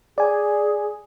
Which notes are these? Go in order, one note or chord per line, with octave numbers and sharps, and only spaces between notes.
G#4 D5 G#5